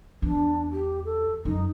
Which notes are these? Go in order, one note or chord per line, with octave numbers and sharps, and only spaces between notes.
E2 D4
G4
A4
F#2 D#4